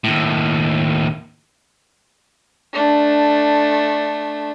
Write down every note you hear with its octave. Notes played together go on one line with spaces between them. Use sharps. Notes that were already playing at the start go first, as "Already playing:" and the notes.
D#2 A2
A3 D4